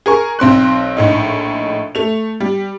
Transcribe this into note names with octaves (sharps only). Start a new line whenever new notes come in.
G#4 A#4 C#6
B1 C4 C6 F#6
A#1 A2 D#4
A3 F7
G3